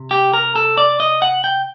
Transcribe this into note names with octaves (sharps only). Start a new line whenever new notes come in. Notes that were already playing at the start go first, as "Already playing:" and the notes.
Already playing: C3
G4
A#4
A4
D5
D#5
F#5
G5